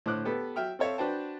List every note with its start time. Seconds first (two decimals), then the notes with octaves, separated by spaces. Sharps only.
0.06 A2 D3 C5 D6 F#6
0.25 B3 G4 A4 B4
0.56 F#3 E5 G5 F6
0.79 C4 A4 C#5 E5 F5
0.98 D4 F#4 B4 C5 G5 A5